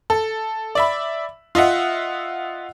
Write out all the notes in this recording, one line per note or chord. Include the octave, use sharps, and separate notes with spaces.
A4
D5 E5 B5
F4 D#5 E5 F#5